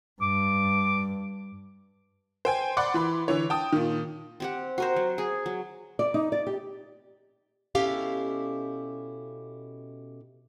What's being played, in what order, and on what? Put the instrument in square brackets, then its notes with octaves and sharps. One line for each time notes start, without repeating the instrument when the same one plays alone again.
[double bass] G2 [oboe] D6
[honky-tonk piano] C5 G5 G#5
D5 F#5 B5 C6 D6
E3 B5 C6
D3 E3 C#5
G5 A5 D#6
A#2 D#3
[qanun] C4 G4 F#5
F#4 A#4 C5
F#3
G#4
F#3
[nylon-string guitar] D5
D#4
D5
G4
[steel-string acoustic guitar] B2 C#4 E4 G4 A4 F5